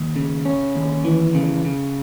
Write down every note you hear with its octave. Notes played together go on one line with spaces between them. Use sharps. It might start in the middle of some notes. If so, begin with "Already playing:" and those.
Already playing: D#2
C#3
C#4
D#2
E3
C#3
C#3